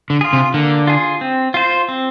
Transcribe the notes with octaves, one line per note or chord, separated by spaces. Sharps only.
D3
F4 G#4
C3
D3 A#3
F4 G#4
C4
F4 C5
C4